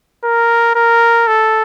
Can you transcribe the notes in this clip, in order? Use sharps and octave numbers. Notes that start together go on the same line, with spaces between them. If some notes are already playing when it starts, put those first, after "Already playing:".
A#4
A#4
A4